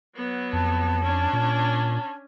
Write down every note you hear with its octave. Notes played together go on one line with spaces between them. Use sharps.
F#3 B3
F2 A5
C#4 D4
A#2